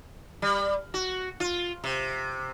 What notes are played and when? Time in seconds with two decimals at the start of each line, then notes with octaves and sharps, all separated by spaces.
0.42 G3
0.94 F#4
1.40 F4
1.84 C3